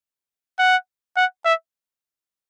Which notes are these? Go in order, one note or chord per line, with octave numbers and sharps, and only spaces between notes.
F#5
F#5
E5